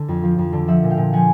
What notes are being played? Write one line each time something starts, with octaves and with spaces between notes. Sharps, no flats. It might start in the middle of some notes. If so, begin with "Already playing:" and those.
Already playing: D3
F2
F3
F2
D3
F3 E5 F#5
A#2
F5 G5
A#2
F3 F#5 G#5